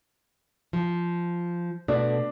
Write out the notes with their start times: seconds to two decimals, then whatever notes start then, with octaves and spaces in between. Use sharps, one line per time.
0.73 F3
1.88 B2 A3 D4